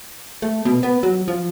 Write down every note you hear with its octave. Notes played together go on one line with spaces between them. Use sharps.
A3
B2
B3
F#3
F3